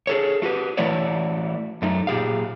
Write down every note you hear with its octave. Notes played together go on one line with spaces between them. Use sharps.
G#4 A4 C#5
A3 F#4 G4 B4
E3 A3 E4 F#4 C#5 D5
F#2 A3 D#4
A#2 G4 G#4 F5